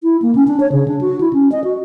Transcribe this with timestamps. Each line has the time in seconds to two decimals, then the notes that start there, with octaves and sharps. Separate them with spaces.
0.03 E4
0.22 A#3
0.35 C#4
0.48 D4
0.60 C#5
0.72 C#3
0.88 D4
1.01 F#4
1.21 E4
1.33 C#4
1.52 D#5
1.64 F#4